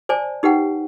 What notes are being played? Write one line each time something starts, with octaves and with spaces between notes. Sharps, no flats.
C5 D5 G#5 A5
D#4 G4 B4 F#5 G5